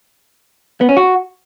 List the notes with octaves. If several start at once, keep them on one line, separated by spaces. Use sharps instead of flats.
B3
C#4
F#4